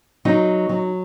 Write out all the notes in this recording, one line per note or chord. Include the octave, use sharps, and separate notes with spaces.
F#3 D#4
F#3